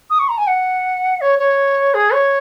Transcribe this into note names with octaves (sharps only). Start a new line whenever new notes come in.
D#6
C#6
A#5
G#5
F#5
C#5
C#5
G#4
C#5